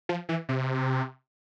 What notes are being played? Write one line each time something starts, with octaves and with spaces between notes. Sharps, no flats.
F3
E3
C3